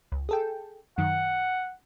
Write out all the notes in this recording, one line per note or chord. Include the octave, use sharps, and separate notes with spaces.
C#2
G#4 A4 G5
F#2 D#3 F#5